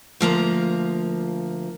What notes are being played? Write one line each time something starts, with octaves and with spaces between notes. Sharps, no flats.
D2 F3 A#3 A#5